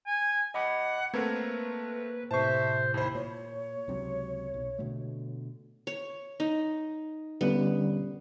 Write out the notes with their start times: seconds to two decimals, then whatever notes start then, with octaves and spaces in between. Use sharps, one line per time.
0.06 G#5
0.54 D#5 F#5 B5 D6
1.14 A3 A#3 C4 A#4 B4 A#5 G#6
2.31 A2 C3 C5 E5 A5 C#6
2.94 D#2 E4 C5
3.15 A#2 C#5
3.88 C#2 C3 F#3
4.54 B1
4.78 B2 D3 A3
5.87 C#5
6.40 D#4
7.41 D3 G3 B3 C#4